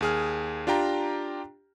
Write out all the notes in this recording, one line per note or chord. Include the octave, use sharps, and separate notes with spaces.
D#2 G#4 F6
D4 F4 G4 G5 A#5